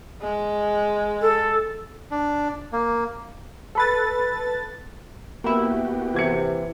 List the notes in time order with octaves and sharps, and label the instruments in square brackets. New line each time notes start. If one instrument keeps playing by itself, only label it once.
[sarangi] G#3
[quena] A4
[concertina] D4
A#3
[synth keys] A4 B4 A6
[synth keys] A#3 E4 [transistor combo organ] B3 F#4 G4
[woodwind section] C3 [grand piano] E3 G#6 C#7